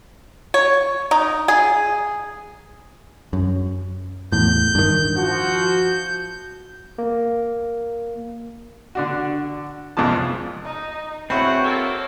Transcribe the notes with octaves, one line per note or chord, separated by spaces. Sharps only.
C#5
D#4
G#4
F#2
E2 A2 G6
G2 D#3
F3 F#4 G6
A#3
D3 D4 F#4
C2 F2 G#2 F3 A5
D#4
E2 C4 F#4 C#5 E5 F#5 B5
A#3 A4 A#4